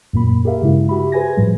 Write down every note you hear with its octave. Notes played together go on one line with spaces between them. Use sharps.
F#2 A#2 A#3 B5
G4 G#4 A#4 E5 F5
G2 C#3 G#3 E4
F#4 G4 E5 B5
G#4 B4 C5 G#5 G#6 A#6
A2 F3 G3